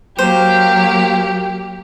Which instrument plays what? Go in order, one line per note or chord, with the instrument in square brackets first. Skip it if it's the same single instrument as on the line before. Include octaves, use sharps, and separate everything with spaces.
[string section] F#3 A#3 [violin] G4 [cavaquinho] C5